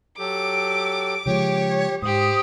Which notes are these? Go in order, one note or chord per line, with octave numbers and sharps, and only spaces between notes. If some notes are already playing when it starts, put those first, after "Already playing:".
F#3 G4 A4 D6
C#3 F3 G#3 G4 C#5
G#2 G4 C5 D#6